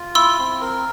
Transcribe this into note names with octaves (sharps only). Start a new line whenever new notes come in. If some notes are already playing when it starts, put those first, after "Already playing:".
Already playing: F4
E4 C6 E6
C4
A#4